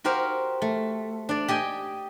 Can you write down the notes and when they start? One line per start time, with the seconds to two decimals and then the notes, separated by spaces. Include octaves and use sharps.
0.04 F#4 G4 A#4 C5 F5
0.62 A3
1.29 D4 D5
1.48 G4 D#5 G5 G#5